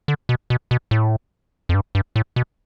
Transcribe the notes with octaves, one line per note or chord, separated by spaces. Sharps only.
D3
B2
B2
B2
A2
F2
G2
G2
A2
B2